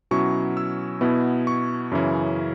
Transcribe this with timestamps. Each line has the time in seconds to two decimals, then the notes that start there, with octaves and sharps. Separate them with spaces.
0.11 B2 F#3 C#4 E4 C#6
0.57 E6
1.01 B2 B3 E4
1.47 C#6
1.92 F#2 C#3 E3 C#4 E4